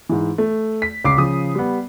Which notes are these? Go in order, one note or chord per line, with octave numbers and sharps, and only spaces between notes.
G#2 E3
A3
B6
C#2 D6 C7
C#3 F3 D#6
G3 B3